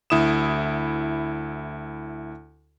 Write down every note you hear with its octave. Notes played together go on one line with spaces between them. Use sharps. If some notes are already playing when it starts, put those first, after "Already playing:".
D2 E4 D#6 E7